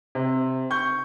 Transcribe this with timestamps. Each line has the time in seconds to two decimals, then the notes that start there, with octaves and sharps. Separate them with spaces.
0.15 C3
0.70 C#6 G6